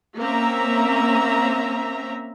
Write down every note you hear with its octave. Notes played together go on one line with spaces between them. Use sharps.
A#3 C4 C#4 E5 A#5